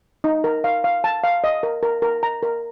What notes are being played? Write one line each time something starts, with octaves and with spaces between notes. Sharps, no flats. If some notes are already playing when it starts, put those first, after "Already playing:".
D#4
A#4
F5
F5
A5
F5
D#5
A#4
A#4
A#4
A#5
A#4